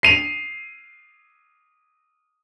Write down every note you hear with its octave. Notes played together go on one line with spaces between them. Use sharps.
C7 D#7 F7